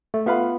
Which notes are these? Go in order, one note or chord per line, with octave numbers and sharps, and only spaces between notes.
A3
B3 F4 B4 F5 B5